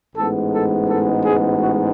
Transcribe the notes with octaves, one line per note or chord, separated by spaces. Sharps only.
A1 G#2 G#3 B3 A4
A4
A4
G#4
F#4